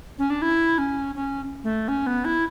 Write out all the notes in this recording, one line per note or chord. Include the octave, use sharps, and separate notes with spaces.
C#4
D4
E4
C#4
C#4
A3
C#4
B3
E4